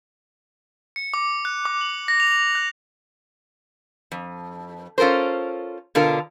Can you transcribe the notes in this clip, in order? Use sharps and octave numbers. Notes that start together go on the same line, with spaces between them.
C#7
D6
F#6
D6
F#7
A#6
F7
F#6
F2
C#4 F4 A4 A#4 C5
B2 D3 F4 A4 A#4